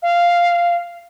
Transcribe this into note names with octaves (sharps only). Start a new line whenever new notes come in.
F5